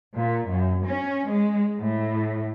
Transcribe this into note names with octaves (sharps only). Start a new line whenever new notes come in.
A#2
F#2
C#4
G#3
A2